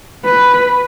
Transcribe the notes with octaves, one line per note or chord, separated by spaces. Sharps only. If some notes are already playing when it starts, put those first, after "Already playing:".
B4